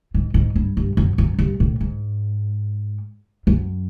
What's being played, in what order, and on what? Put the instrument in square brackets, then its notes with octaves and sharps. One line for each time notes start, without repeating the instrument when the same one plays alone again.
[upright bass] G#2
G#2
G2
G2
F#2
F#2
G2
A2
G#2
F#2